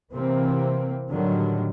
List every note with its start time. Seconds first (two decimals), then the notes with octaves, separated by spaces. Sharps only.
0.12 C3 E3 A#3 C4
1.10 A2 D3 D#3 F#3 G3